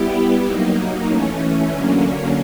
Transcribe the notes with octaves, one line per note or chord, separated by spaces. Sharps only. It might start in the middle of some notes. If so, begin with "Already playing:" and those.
Already playing: G3 B3 E4 G4
F#3 A#3 D#4
E3 A3 C#4
D3 F#3 A#3 C#4